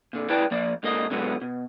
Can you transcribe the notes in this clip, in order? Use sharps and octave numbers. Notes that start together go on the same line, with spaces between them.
A#2 D3
C#2 E4 B4 D5 G5 A5
F3 A#3 D5
G#2 D3 A#3 D#5
B2 D3 F#3 G#3 B3
B2